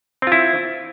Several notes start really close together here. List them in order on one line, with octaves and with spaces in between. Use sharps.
C4 F4 E4